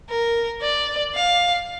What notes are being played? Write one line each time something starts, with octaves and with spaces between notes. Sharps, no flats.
A#4
D5
F5